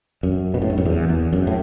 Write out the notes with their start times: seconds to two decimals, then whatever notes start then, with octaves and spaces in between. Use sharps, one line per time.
0.23 F#2
0.54 B2
0.62 A2
0.70 G2
0.78 F#2
0.85 E2
1.09 E2
1.33 F#2
1.47 A2